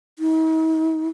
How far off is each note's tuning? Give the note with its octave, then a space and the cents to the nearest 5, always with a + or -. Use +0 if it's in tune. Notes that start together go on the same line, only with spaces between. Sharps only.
D#4 +45